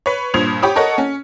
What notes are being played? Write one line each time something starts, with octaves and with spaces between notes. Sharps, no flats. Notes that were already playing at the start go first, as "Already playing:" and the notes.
B4 C#5
G2 A#2 C5 D#6 G#6 F7
G4 C#5 B5 D#6
A4 A#4 C#5 D#5 F#5
C#4